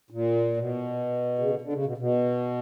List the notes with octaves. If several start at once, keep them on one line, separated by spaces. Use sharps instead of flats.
A#2
B2
C#3
D3
D3
C#3
B2
B2